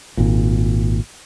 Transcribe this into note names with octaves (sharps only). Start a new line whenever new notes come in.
G#1 A#2